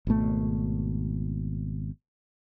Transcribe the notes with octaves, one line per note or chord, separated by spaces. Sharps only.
G#1 B2 A3